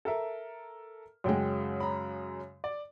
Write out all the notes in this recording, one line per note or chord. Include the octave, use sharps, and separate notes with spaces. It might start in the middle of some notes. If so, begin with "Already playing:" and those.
A4 A#4 E5
F#2 C#3 G#3 F#5 G5
A#5 B5
D5